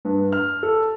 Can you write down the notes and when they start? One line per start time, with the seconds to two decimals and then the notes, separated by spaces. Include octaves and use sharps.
0.05 G2
0.32 F6
0.63 A4